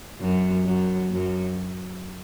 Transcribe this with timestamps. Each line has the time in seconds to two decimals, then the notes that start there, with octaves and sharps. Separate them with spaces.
0.21 F#2 F#3
0.66 F#2 F#3
1.11 F#2 F#3